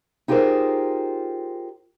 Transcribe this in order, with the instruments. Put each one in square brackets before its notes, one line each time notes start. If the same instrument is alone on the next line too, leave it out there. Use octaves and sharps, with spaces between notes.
[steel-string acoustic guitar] D#4 F4 G4 G#4 A#4 C5